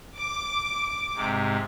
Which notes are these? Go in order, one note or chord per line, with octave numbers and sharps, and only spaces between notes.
D6
G#2 C3